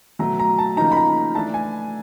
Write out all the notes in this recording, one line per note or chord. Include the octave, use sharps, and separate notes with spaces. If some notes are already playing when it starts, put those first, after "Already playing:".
B2 F#3 A3 A#5
A#5
A5
C#3 F3 A#3 D#4 A#5
B5
A#5
E3 A3 D4 A5
G#5